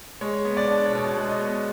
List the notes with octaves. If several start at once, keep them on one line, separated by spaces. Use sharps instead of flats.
G#3 C#5
B3
D5
D4
C#5
B2 D5
G#3
D#5
B3